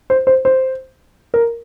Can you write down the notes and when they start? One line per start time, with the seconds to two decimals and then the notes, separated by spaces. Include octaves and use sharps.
0.10 C5
0.27 C5
0.45 C5
1.34 A#4